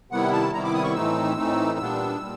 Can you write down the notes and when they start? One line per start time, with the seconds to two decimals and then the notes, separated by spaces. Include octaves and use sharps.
0.10 C3 D#3 G3 B3 E4 F#5
0.32 A5
0.53 C3 D#3 G3 B3 E4 A#5
0.64 D6
0.74 D#6
0.84 C#6
0.95 A2 E3 A3 C4 D#4 E6
1.37 A2 E3 A3 C4 D#4
1.79 A#2 G3 B3 D4
2.20 A#2 G3